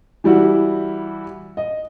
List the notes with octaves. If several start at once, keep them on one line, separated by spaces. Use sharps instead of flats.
E3 G3 E4 F#4
D#5